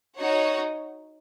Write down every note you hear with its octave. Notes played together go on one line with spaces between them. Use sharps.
D#4 F#4 C#5 F#5